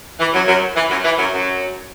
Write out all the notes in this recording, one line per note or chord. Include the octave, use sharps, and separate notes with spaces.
E3
F#2 F#3
F#2 F#3
E3
F#2 F#3
E3
F#2 F#3
F#2 F#3